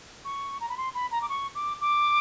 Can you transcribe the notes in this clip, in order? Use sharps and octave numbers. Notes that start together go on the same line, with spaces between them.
C#6
A#5
B5
C6
B5
A#5
D6
C#6
D6
D6